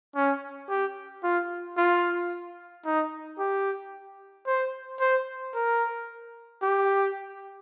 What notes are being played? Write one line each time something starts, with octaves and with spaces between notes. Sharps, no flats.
C#4
G4
F4
F4
D#4
G4
C5
C5
A#4
G4